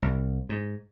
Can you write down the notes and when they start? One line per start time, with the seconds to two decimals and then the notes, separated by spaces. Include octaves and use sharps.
0.02 C2
0.49 G#2